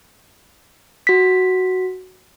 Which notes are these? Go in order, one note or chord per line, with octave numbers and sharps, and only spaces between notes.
F#4 B6